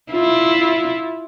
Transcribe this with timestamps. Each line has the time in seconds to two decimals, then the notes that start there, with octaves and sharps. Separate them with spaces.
0.12 E4 F4